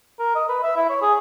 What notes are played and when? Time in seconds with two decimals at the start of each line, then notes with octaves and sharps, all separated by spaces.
0.19 A#4
0.35 D#5
0.49 B4
0.63 E5
0.76 E4
0.89 C#5
1.02 G#4